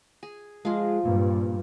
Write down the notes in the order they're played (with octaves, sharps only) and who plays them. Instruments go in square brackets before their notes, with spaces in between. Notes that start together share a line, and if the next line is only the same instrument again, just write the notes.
[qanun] G#4
[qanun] F3 F4 [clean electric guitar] G#3 G#4
[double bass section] G2 [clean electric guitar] A#2